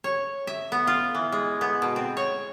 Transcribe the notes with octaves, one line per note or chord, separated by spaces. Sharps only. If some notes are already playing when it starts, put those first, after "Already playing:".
C#5
E5
B3
F4
E3
G#3
B3
B2
C4
C#5